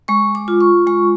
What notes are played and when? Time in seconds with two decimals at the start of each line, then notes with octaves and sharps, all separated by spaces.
0.08 G#3 C#6
0.35 D6
0.48 F4
0.61 C#6
0.87 G#3 C#6